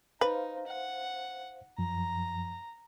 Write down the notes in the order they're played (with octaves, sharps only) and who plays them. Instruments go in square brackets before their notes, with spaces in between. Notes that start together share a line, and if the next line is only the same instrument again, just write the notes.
[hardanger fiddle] D#4 [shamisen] B4 [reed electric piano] C5 F5
[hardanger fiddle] F#5
[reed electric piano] F#2 F3 [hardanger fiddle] A#5